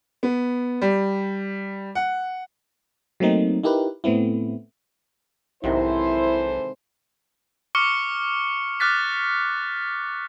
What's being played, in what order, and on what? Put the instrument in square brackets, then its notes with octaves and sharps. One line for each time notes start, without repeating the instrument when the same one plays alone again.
[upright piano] B3
G3
F#5
[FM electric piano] F#3 A3 A#3 C4 D#4
D#4 E4 G4 A#4 B4
A2 A3 B3 C4 E4
[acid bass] B1 [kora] G#2 C3 D#3 [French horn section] E3 A4 C5 [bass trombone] E4
[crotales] C#6 D6 F6 C#7 G7
D6 F6 F#6 A6 B6